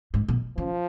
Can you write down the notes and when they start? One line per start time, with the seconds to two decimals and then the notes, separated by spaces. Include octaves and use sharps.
0.14 G#2
0.28 B2
0.58 C#3 F3